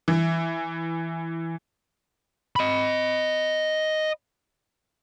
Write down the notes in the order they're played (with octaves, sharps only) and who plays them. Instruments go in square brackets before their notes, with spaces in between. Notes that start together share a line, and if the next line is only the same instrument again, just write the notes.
[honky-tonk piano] E3
[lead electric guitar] D#5 B5